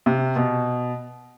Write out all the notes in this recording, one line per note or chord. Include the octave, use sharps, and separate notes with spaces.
C3
B2